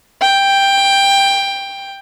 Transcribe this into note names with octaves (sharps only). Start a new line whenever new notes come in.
G5